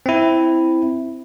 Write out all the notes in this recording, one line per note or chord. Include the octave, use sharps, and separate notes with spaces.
C4 E4